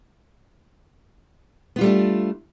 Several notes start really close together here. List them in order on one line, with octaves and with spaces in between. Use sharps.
B3 F4 G3 A3 D4